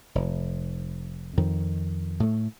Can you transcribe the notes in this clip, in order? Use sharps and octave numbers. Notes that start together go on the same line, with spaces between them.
F1
F2 D#3
A2 A3